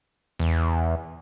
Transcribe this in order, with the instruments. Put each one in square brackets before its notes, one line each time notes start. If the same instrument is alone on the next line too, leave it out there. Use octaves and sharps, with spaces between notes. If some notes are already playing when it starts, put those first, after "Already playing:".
[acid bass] E2